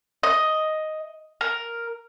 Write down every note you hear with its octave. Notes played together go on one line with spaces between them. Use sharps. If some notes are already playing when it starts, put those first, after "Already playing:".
D#5
A#4